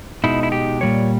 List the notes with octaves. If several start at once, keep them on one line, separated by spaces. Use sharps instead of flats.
B2 G#3 D#4 E4
E4
G4
A#2 G3 C#5